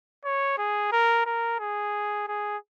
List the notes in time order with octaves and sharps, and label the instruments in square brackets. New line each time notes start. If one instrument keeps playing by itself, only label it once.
[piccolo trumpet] C#5
G#4
A#4
A#4
G#4
G#4